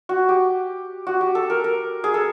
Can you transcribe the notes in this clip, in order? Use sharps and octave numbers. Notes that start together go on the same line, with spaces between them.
F#4
G4
F#4
G4
A4
A#4
A#4
G#4
A4